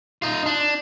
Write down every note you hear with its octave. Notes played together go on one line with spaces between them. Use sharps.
D#4 F4
D4